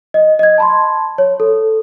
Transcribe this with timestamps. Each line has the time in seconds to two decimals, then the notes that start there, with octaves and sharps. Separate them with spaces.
0.14 D#5
0.39 D#5 G#6
0.58 A5 B5 C6
1.18 C#5
1.40 A4